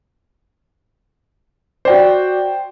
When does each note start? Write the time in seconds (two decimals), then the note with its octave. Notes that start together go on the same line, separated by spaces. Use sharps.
1.85 F#4 C5 D5 G5